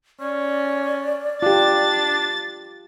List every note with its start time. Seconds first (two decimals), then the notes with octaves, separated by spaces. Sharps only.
0.20 C#4 D5
1.42 D4 F4 G4 A6